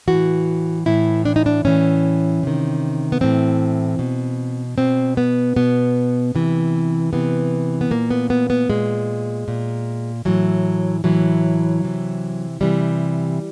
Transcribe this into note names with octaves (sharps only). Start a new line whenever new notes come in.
E3 F#4
A2
A2 E3 E4
D4
D#4
D4
A2 E3 C#4
C3 D#3
B3
A2 E3 C4
B2
B2 C4
B3
B2 B3
C3 E3
C3 E3 B3
B3
A#2 A#3
B3
B3
B3
A#2 G#3
A#2
A2 E3 F#3
A2 E3 F#3
C3 E3
C3 E3 G3